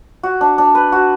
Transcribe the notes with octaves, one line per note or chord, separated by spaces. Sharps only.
F#4
D4
D4
B4
F#4